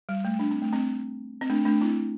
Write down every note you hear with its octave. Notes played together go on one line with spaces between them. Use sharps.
G3
A3
D4
C4
A3
C4
C4
A3 D4
A3 D4
C4 E4